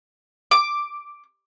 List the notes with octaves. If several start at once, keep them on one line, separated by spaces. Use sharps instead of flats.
D6